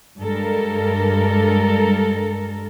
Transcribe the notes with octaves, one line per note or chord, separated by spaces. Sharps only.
G2 G3 G#3 A4 A#4